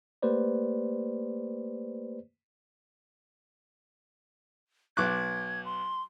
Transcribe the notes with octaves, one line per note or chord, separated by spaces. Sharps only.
A3 A#3 G4 B4 C5 D5
B1 D6 F#6 G#6
C6